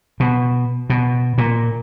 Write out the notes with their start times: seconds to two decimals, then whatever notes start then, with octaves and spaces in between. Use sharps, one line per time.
0.20 B2
0.90 B2
1.38 A#2